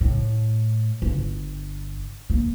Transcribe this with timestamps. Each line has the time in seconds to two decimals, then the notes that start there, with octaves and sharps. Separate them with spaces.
0.01 A2
1.02 G1
2.30 A#3